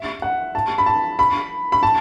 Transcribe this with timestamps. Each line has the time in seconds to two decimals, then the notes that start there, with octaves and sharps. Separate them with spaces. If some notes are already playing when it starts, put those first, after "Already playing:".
Already playing: E5
0.22 F#5
0.55 A5
0.78 B5
0.86 A5
1.19 B5
1.72 B5
1.83 A5